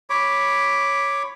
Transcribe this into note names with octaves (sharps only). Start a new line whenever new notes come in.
C#5 B5 D6